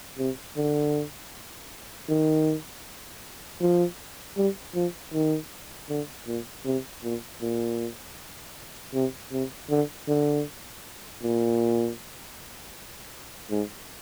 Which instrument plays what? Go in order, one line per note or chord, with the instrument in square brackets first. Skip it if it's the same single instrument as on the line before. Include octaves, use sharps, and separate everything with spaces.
[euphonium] C3
D3
D#3
F3
G3
F3
D#3
D3
A#2
C3
A#2
A#2
C3
C3
D3
D3
A#2
G#2